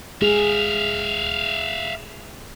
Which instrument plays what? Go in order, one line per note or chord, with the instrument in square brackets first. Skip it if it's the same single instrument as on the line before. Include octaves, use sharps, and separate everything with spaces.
[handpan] G#3 G#4 [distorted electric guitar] E5 F5